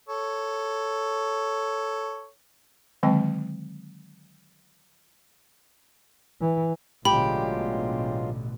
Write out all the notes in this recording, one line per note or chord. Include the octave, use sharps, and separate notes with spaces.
A4 C#5
D3 D#3 F#3 G#3 C4 G5
E3
A1 B2 D3 F#3 G#3 F4 G4 B5